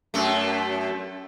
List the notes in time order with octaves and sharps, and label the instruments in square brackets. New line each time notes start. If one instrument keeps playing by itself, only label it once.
[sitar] F#2 A3